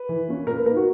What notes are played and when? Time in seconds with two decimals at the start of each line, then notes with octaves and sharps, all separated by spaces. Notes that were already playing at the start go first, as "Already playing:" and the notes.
Already playing: B4
0.09 E3
0.29 A#3 C#4
0.47 A#2 A#4
0.57 B4
0.66 A#3 D#4 A#4
0.76 F#4